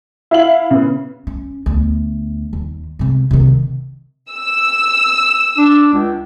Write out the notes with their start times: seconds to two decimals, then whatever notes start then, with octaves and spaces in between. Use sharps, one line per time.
0.31 E4 F5 F#7
0.70 C#3 B3
1.27 C#4
1.66 D2 B3
2.53 D#2
2.99 G#2 C3
3.31 C3 D#3
4.31 E6
5.58 D4
5.94 C#2